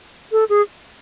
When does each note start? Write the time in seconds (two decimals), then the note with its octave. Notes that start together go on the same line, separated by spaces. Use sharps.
0.32 A4
0.49 G#4